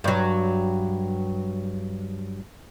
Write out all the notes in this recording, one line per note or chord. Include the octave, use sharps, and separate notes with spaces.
G2 F#3